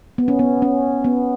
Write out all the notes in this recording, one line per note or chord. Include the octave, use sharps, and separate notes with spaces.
B3
C#4
B3
C#4
B3